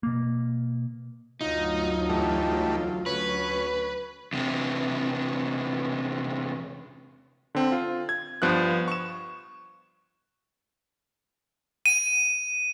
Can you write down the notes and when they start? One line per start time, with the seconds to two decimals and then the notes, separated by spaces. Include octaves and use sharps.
0.03 B2 A#3
1.41 G1 D2 F#3 D#4 F4
2.09 E2 G3 A3
3.06 D2 F#3 C#4 B4
4.33 E2 C3
7.55 D3 C4
7.72 F4
8.09 G#6
8.42 G2 F3 B3 F#6
8.88 C#6 E7
11.86 D#7